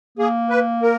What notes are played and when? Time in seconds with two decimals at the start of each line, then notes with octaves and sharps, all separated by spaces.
0.18 A#3 G#4
0.50 B4
0.82 A#4